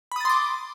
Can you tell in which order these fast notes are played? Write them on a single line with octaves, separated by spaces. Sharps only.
B5 D#6 A6 C6 D6